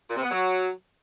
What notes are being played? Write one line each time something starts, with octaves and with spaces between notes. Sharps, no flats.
A#2
C3
B3
F#3